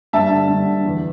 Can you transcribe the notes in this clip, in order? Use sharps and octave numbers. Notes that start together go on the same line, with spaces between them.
G2 E5 A5
D3
G2
D3
E2